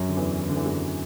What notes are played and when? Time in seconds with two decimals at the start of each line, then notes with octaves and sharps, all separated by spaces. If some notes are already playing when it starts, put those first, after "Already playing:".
Already playing: F#2 F#3
0.09 D3
0.17 E2 E3
0.41 E3
0.49 D3
0.55 E2 E3
0.66 F#2 F#3